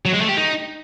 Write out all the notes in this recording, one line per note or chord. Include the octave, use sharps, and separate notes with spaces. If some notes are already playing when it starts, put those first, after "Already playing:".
F#3
G#3
A3
G4
D#4